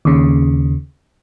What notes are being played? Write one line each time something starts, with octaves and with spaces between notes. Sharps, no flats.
D#2 C#3